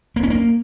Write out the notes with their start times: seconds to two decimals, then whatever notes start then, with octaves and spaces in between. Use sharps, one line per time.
0.16 A#3
0.23 C#4
0.30 A#3